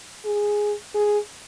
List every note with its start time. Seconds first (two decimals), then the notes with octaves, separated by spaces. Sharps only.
0.25 G#4
0.94 G#4